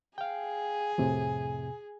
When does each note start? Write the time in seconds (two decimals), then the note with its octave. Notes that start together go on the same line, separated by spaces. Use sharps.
0.18 G#4 F5 G5
0.98 F2 A2 C3